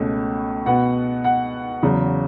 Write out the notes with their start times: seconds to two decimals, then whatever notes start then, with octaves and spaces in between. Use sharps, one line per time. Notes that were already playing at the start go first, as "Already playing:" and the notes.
Already playing: C#2 B2 A3 C#4
0.66 B2 B3 F#5
1.24 F#5
1.83 E2 C#3 F#3